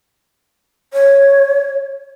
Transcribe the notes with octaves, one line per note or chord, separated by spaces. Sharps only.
C#5